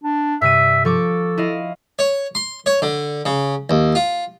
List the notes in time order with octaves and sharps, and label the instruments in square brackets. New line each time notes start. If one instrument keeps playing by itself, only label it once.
[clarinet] D4
[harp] G2 C3 D#7 [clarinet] E5
[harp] F3 C#6 D6 [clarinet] A4
[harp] E4 D#5 F5
[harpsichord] C#5
C6
C#5
D3
C#3
D#2
F4